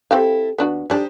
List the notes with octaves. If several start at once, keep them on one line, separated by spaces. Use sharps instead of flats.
C4 E4 G4 A4 F5
D#2 B3 D4 F#4
G3 D4 D#4 G4 C5